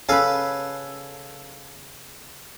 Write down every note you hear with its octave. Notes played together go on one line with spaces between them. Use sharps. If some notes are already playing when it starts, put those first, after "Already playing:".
C#3 A4 B4 F5 G#5